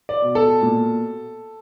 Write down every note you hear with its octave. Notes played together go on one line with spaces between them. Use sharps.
D5
B2
A4
A#2